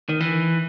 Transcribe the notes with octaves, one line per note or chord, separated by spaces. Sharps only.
D#3
E3